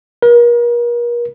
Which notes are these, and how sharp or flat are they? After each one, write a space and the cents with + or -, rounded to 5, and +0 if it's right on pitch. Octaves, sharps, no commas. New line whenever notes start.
A#4 +40